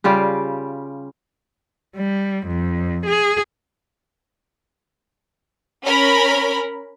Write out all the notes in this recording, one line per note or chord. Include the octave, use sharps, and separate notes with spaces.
C#3 G3 F4 G4
G3
F2
G#4
C#4 A#4 B5